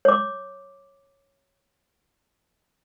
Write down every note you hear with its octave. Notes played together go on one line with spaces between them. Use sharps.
C#5 D6